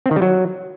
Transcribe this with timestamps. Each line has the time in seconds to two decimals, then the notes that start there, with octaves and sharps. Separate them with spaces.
0.06 C4
0.11 D#3
0.16 G3
0.22 F#3